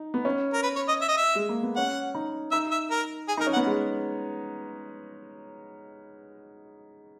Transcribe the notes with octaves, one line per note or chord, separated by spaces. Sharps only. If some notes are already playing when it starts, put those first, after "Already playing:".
Already playing: D#4
B3
C#4
A#4
B4
C#5
D#5
E5
D#5
E5
G#3
A#3
B3
C#4 F#5
D#4
D#4 E5
E5
A#4
G#4
D#4
A#4
C#4
F#5
B3
G#3